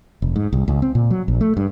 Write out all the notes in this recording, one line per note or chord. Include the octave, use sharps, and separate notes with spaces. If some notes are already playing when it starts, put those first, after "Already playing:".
F1
G#2
C2
C#2
C4
A#2
F#3
A#1
A3
G2